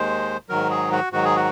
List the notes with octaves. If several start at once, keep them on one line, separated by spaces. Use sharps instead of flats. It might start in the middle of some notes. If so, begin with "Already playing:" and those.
Already playing: D#2 D#3 G#3 C5
G#2 D#3 F#3 A#4
G#4
F#4
G#2 D#3 F#3 F#4
G#4
F#4